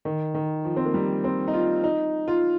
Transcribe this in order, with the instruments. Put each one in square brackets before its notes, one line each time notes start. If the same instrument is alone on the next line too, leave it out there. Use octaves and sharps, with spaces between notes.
[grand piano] D#3
D#3
F3
C4
A#3
G3
C4
D#4
F4
D#4
F4